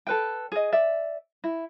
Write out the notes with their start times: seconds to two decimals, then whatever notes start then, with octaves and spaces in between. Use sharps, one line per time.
0.07 A4 B4 G5
0.52 G#4 D#5
0.72 D5 E5
1.44 E4